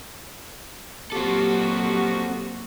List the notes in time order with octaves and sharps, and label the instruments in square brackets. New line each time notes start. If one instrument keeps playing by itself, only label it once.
[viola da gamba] A#2 F#3 [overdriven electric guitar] C4 A4 [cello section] F#4 [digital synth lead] G4